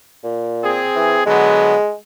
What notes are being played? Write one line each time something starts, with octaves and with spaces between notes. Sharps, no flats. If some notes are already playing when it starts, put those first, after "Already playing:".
A#2
C4 G#4
E3
D3 F#3 G#3 B3